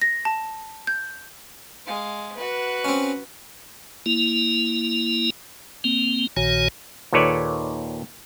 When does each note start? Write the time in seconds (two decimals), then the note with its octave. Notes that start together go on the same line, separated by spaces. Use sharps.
0.01 A#6
0.25 A5
0.87 G6
1.86 G#3 F5
2.36 F#4 B4
2.84 C4 C#4
4.06 A#3 E4
5.84 A#3 C4
6.37 A#1 A#2 D#3 F#4 C#5 G#5
7.13 D#2 A#2 A4 B4 C#5 D5